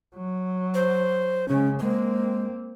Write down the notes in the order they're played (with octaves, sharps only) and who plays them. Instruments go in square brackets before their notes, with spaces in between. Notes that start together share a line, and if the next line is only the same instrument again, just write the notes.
[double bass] F#3
[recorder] C5
[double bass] C#3 G#3 [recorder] C#4
[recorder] G#3 [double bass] A#3 C4